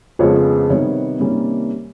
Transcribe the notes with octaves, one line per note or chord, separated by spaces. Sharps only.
F2 C#3 F3 G#3 B3 C#5
C3 D#3 G3 B3 C#5
C3 D#3 G3 A#3 C#4